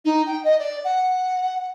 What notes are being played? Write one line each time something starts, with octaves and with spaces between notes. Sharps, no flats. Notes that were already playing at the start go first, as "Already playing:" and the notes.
D#4
G5
D#5
D5
F#5